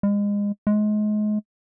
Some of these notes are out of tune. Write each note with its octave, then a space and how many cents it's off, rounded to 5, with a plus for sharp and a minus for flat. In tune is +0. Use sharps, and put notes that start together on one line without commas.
G#3 -30
G#3 +30